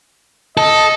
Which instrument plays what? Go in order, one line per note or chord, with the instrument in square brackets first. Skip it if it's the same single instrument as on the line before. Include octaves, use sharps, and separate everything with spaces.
[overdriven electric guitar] A4 [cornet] D#5